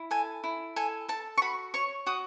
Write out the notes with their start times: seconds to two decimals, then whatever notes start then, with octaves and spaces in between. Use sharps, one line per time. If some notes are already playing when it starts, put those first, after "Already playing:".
Already playing: E4
0.11 A4 G#5
0.44 E4
0.76 A4 G#5
1.08 A4 A5
1.38 C#6
1.42 F#4 B5
1.74 C#5 C#6
2.06 F#4 D#6